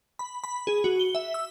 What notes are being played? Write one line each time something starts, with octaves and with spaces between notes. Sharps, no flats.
B5
B5
G#4
F#4
G7
E5
E6